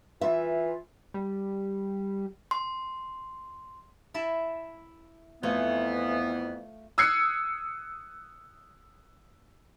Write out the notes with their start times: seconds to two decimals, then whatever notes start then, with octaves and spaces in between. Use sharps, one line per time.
0.21 E3 F4 E5
1.14 G3
2.51 C6
4.14 E4 E5 A5
5.43 F2 E3 A3 B3 F4 G#5
6.98 D#6 E6 F#6 G#6 C7 C#7